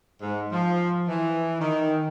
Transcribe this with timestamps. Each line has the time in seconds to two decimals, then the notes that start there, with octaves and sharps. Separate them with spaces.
0.22 G#2
0.52 F3
1.08 E3
1.61 D#3